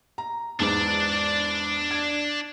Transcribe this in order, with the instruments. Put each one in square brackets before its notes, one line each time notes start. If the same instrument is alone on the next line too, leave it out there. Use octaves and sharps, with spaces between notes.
[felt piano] A#5
[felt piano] E2 G#2 [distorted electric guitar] D4 D5
[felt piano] G#6